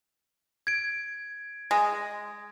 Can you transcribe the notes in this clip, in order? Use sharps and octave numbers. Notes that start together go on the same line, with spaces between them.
G#6 D7
G#3